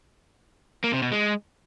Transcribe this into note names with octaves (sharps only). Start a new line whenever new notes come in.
A#3
C3
B2
G#3